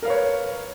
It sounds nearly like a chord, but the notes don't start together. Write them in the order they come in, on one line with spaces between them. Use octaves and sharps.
A#4 F5 B4 C#5